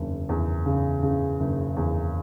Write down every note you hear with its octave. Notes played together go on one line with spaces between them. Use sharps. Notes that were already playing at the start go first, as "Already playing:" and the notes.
Already playing: F#1 E2
E2
C#3
C#3
F#1
E2